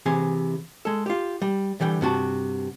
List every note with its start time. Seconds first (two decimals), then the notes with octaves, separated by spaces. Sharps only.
0.06 C3 E3 G#4 G#5
0.85 G#3 A4
1.06 F4 G4
1.42 G3
1.80 D3 E3 G3 G5
2.01 G2 C3 F#4 A5